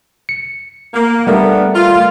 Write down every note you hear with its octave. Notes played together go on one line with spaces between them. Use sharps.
C#7
A#3
G3 A3 B3 D4 A#4
F4